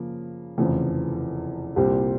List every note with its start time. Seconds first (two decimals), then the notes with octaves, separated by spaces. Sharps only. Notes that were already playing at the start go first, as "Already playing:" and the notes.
Already playing: C#3 F3 A#3
0.58 F1 E2 C#3 F3 C4
1.76 C2 A#2 G3 C4 G4